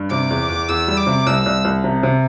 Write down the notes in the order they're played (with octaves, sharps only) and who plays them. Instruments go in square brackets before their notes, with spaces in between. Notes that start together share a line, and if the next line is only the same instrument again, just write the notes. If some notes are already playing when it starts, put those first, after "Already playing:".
Already playing: [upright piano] G2
[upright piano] C3 [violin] D6
[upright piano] E2
E2
[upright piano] E2 [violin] E6
[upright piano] G3
[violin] D6
[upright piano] C3
[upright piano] C2 [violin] E6
[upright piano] C2
C2
C3
C3